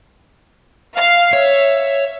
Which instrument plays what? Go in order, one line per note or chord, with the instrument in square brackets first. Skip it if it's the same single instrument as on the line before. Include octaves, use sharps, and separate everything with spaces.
[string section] F5
[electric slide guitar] C#5 [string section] E5